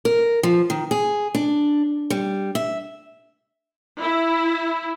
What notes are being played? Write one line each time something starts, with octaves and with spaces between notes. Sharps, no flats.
A#4
F3
D#3
G#4
D4
G3
E5
E4